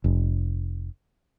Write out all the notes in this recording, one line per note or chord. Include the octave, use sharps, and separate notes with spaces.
F1